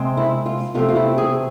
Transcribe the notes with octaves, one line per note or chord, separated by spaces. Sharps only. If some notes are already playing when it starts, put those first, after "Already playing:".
Already playing: C3 G#3 C4
E4
F4
E2 C3 F3 A3 C4 F4
F4
E4
G#4